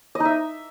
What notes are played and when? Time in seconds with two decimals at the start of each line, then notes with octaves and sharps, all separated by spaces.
0.15 D#5
0.20 D#4
0.25 E5